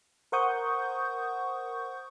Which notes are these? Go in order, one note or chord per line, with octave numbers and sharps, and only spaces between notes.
A#4 C5 F#5 C#6 D#6 G6